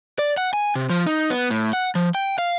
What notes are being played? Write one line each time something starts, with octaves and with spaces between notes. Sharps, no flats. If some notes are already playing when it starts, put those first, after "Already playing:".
D5
F#5
G#5
C3
F3
D#4
B3
A2
F#5
F3
G5
F5